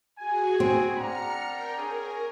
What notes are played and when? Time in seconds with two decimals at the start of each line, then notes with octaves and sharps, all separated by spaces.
0.18 F#4 G#4 G#5
0.60 C4
0.97 D4 F#5 A#5 F6 C#7
1.46 A#4 G5
1.78 G#4 A#4 C#5 G#5